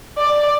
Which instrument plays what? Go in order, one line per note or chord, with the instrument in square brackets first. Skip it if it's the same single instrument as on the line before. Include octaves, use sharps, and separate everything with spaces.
[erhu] D5